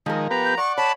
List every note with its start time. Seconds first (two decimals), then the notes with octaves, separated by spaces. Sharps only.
0.06 D#3 F3 G#3 A#4
0.31 B3 G4 B4 A#5
0.45 G6
0.58 D5 F#5 C#6
0.78 C#5 A5 B5